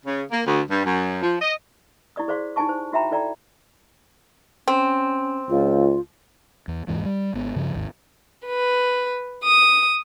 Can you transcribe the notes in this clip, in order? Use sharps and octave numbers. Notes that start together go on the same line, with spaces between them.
C#3
A#3
D2
G2
F#2
F3
D#5
E4 G4 D5 D#6
G#4 C5 D5 F5 C6
D#4 E4 G4 G#5 A5 C#6
C5
E4 F#4 E5 G5 A#5 B5
E4 A4 D5 G5 A#5
C4 C#4
C#2 F4
E2
D1 E2 G#2 E3
G3
G#1 B3
G2 C#3 F3
G#1 D#2 G#2
B4
D#6